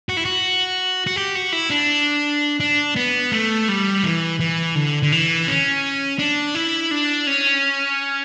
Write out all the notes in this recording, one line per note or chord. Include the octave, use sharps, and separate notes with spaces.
F#4
E4
F#4
F#4
G4
F#4
E4
D4
D4
B3
A3
G3
E3
E3
D3
D3
E3
C#4
D4
E4
D4
C#4